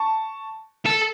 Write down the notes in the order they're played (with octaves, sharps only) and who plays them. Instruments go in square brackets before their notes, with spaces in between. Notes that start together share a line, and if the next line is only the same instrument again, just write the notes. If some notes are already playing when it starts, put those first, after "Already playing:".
Already playing: [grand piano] A5 C#6
[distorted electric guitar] A4